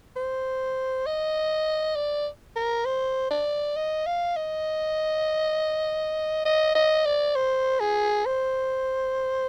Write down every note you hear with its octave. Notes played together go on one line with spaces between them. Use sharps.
C5
D#5
D5
A#4
C5
D5
D#5
F5
D#5
D#5
D#5
D5
C5
G#4
C5